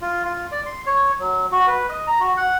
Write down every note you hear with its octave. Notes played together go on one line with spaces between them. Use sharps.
F4
F4
D5
C6
C#5
F#3
F#4
B4
D#5
A#5
F#4
F#5